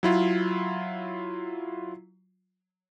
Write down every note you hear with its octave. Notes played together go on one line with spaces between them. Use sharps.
F#3 E4 F4